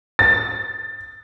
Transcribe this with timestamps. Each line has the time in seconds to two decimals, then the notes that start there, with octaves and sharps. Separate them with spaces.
0.19 A6